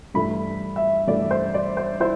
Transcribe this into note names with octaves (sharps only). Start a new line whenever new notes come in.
G2 E3 A3 E4 B5
E5
G2 E3 A3 E4 D5
C5
D5
C5
E4 C5